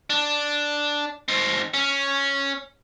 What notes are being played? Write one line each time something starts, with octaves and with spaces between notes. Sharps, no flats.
D4
C4 D#4
C#4